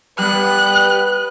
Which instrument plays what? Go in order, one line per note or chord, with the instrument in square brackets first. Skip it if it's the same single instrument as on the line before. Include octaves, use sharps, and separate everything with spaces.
[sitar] G3 B3 [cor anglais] B4 [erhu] F#6